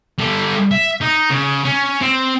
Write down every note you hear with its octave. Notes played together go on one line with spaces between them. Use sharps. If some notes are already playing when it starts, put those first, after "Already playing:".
G3 A4
E5
D#4
C#3
C#4
C4